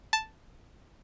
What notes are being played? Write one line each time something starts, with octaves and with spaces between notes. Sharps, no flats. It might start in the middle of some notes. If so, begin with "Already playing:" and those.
A5